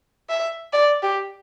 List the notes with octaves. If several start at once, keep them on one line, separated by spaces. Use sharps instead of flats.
E5
D5
G4